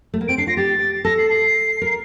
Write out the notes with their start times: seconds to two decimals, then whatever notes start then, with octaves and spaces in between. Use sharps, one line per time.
0.14 A3
0.21 A#3
0.28 C4 D7
0.38 D4 C7
0.47 F4 A#6
0.57 G4 A6
1.05 A4 A#6
1.18 C7
1.31 C7
1.82 A#4